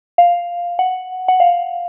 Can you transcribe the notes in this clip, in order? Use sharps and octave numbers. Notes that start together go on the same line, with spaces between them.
F5
F#5
F#5
F5